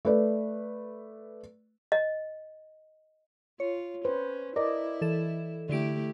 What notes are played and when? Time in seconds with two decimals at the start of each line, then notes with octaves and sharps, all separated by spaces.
0.05 A3 B4 D5
1.92 D#5
3.60 F4 C#5
4.05 C#4 B4 C5
4.56 E4 A#4 D5 D#5
5.01 E3 A4 E7
5.69 D3 A3 E4 G4 D7